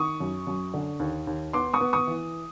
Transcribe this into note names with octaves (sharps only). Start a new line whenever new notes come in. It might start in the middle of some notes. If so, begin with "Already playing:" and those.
Already playing: D#3 C#6 D#6
F#2
F#2
D3
D#2
D#2
B3 C6 D6
C#6 D#6
B3
C#6 D#6
E3